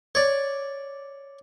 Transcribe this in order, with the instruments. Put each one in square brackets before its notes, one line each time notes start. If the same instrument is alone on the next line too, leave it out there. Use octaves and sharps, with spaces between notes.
[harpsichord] C#5 D5